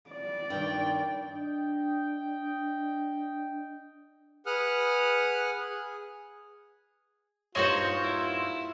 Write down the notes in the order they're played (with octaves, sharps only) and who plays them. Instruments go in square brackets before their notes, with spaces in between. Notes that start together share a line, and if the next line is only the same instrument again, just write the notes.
[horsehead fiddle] D5
[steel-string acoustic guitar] G2 D#3 [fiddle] G5
[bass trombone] D4 [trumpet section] D#5 G5
[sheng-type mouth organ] G#4 B4 F#5 D#6 F6 F#6
G#4
[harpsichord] G2 A#2 C6 [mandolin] D#4 F#4 C5 [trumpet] F4 [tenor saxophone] C#5
[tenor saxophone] E4